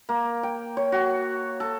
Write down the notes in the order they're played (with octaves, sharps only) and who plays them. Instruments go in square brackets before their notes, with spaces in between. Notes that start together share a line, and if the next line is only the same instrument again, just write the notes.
[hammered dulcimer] A#3
G5
C#5
F#4
A4